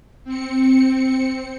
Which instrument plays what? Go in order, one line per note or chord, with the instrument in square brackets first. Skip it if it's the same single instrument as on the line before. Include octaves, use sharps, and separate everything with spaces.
[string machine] C4 C#7